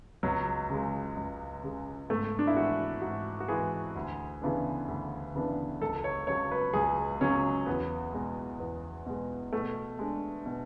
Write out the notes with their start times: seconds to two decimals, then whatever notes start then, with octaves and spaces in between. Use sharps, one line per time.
0.23 C#2 F#3
0.70 C#3 G#3
1.17 C#2
1.63 C#3 G#3
2.09 G#2 A3
2.39 D4
2.47 E4
2.56 E3 G#3 F#4
3.02 G#2 F#4
3.40 F#4
3.48 E3 G#3 G#4
3.95 D2
4.42 C#3 E3 B3 D4
4.88 D2
5.35 C#3 E3 B3 D4
5.81 C#2 A4
6.04 C#5
6.27 C#3 F#3 C#5
6.51 B4
6.73 C#2 G#4
7.21 C#3 F#3 C#4
7.66 E2 B3
8.13 B2 G#3
8.60 E2
9.06 B2 G#3
9.52 B2 A3
9.99 G#3 D4
10.46 B2